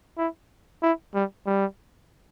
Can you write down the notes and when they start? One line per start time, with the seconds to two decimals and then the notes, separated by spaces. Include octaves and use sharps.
0.18 E4
0.82 E4
1.14 G3
1.46 G3